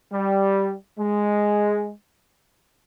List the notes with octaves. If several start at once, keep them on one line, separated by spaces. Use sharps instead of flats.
G3
G#3